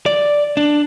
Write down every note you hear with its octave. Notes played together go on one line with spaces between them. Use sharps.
D5
D4